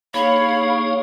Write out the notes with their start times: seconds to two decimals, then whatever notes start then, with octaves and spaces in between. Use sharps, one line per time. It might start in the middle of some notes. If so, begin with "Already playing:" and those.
0.14 A#3 D#4 G#4 C#5 F5 B5